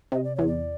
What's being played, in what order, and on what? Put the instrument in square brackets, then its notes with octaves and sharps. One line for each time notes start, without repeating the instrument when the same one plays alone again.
[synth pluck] C3 [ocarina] D#5
[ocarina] D5
[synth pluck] E2 [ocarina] C#5
[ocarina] D5